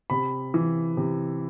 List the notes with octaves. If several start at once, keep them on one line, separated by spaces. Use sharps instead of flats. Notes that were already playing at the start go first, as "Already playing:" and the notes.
C3 B5
E3
C3